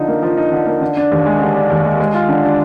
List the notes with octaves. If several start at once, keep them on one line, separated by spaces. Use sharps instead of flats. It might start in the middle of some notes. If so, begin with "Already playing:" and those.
Already playing: D3 F3 D#4
A#3
F3
D#4
D3
A#3
D3
D4
D#2
G#3
D3
D4
D#2
G#3
G#3
F4
D3
D4